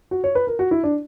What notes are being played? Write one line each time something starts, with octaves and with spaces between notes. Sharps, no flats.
F#4
C#5
B4
A#4
F#4
E4
D4